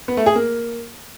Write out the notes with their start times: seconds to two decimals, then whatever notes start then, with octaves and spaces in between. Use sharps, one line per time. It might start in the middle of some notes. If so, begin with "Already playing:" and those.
0.08 B3
0.17 A3
0.26 G#4
0.35 A#3